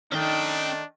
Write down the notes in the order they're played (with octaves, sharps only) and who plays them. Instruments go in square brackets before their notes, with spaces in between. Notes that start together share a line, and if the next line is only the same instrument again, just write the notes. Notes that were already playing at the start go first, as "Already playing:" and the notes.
[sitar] D#3 A3 [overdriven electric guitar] C#4 G5 [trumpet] D4